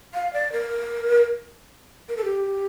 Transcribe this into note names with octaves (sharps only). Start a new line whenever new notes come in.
F5
D5
A#4
A#4
A4
G4